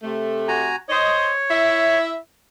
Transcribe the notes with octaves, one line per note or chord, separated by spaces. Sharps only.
C3 A3
F#4 G#5 A#5
C5 C#5 D#5
E4 E5